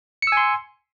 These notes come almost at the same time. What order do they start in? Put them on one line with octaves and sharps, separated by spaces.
C#7 E6 G#5 C6